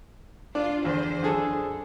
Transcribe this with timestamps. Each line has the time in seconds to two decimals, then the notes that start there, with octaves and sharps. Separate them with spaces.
0.55 D4 F4
0.85 E2 D3 C5
1.23 F#2 D3 G#4 A4